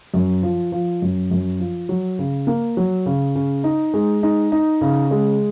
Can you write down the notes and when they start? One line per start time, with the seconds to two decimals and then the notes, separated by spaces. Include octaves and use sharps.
0.14 F#2
0.43 F3
0.72 F3
1.02 F#2
1.31 F#2
1.60 F3
1.89 F#3
2.19 C#3
2.47 A#3
2.77 F#3
3.06 C#3
3.35 C#3
3.64 D#4
3.94 G#3
4.23 D#4
4.52 D#4
4.81 C#3
5.11 G#3